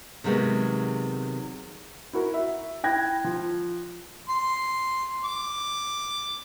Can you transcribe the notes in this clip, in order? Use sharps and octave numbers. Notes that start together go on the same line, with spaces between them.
C3 D#3 F#3 G#3 B3
E4 F#4 A#4
E5
E4 G5 F#6 G#6 A#6
F3
C6
D6